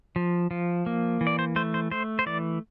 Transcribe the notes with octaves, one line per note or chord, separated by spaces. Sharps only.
F3
F3
A#3
E3
D5
C5
A3 C5
C5
A3 C5
C5
E3 D5